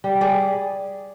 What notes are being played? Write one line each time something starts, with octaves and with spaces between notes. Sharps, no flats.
G3
G#4 D5